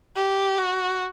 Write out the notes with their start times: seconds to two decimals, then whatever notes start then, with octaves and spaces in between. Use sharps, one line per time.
0.16 G4
0.58 F#4